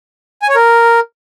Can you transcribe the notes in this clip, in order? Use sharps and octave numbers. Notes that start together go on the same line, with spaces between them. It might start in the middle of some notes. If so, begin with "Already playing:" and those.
G#5
C#5
A#4